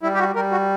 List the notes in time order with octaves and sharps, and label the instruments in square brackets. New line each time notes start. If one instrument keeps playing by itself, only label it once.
[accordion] G3 E4
G4
F#4
G3 A#4
F#4